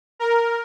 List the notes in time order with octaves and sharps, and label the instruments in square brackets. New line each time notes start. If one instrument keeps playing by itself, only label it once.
[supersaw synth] A#4